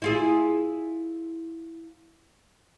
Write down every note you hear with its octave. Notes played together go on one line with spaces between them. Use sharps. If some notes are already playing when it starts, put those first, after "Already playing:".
E4 F4 G#4